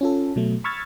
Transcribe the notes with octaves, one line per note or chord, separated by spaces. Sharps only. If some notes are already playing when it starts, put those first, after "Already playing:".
C#4 F4 A4
B2 F#3 A3
B5 C#6 E6 F6 G#6 A6